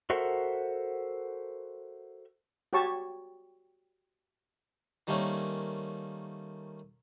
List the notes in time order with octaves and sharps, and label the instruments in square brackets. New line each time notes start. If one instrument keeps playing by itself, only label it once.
[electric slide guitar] F#4 A4 A#4 C5 E5 F#5
[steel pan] F#4 G4 C#5 A5 C#6
[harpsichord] D#3 G3 A3 A#3 C4 C#4